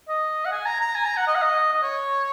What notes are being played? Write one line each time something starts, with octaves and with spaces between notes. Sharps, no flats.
D#5
F#5
G#5
A#5
A#5
G#5
A#5
F#5
D#5
F#5
D#5
D#5
C#5